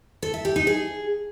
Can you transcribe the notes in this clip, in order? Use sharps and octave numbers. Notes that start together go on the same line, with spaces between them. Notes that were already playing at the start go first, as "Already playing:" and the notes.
A4
E5
G4
D#4
G#4